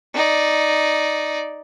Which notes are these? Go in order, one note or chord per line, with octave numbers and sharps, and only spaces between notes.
D#4 D5